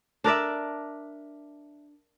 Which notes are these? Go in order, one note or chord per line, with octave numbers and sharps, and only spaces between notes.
D4 A#4 D5 E5